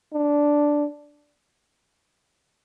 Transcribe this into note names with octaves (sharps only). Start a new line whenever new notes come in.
D4